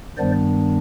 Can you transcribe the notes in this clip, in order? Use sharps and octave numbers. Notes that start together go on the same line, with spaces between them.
G2 D#3 G3 B3 D4 C5 D5